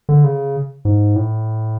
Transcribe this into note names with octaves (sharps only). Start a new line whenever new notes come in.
D3
C#3
G#2
A2